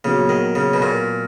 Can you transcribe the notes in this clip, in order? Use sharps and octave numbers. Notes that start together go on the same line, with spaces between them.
A#2 C#3 F#3 B3
D#3
C#3
B2
A#2